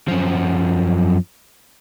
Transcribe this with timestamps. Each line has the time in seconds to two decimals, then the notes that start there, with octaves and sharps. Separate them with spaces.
0.08 F#2 F3